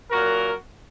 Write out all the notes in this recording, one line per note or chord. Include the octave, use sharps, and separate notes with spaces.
A#2 F#3 F#4 A#4